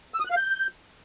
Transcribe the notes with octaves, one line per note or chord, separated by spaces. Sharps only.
E6
D#6
F#6
F5
G6